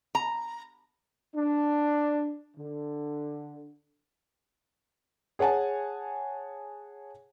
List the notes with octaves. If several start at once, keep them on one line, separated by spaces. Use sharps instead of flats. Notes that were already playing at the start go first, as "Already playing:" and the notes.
A#5
D4
D3
G#4 C#5 F#5 G#5 A5